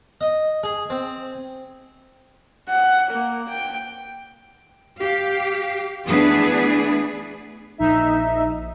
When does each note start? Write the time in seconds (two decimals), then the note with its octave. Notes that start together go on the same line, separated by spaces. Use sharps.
0.21 D#5
0.63 G#4
0.90 C4
2.69 F#5
3.10 A#3
3.48 G5
5.00 G4 F5
6.06 E3 A3 B3 D4 G#4 B4
7.78 A#1 D#4 E5